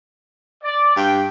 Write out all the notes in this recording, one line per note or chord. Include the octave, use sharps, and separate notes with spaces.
D5
G2 G5